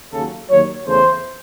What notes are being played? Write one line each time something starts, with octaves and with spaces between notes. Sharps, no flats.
D#2 C#3 F#3 A4
D#2 D#3 F#3 C#5
E2 C#3 E3 A3 C5